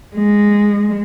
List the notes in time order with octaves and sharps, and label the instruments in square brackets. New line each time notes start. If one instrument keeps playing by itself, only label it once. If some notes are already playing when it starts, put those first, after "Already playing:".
[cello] G#3